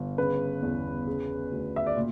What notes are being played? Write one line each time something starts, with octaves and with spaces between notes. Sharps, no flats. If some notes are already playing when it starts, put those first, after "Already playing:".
Already playing: G1
C#3 B4
E2
C#3
D2
E5
D5
A#2